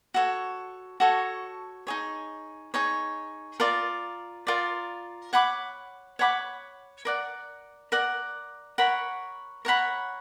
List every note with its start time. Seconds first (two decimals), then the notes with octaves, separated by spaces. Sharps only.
0.14 F#4 A4 C#5
1.00 F#4 A4 C#5
1.87 D#4 G#4 C#5
2.74 D#4 G#4 C#5
3.60 F4 A#4 D5
4.47 F4 A#4 D5
5.33 C#5 F#5 B5 D6
6.19 C#5 F#5 B5 D6
7.05 A#4 D5 F#5
7.92 A#4 D5 F#5
8.78 A#4 C#5 F#5 B5
9.65 A#4 C#5 F#5 B5